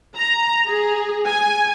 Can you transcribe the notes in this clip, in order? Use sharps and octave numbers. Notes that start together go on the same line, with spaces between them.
A#5
G#4
G#5